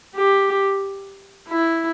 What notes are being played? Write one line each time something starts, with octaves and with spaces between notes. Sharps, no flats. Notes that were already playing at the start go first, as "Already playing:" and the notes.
G4
E4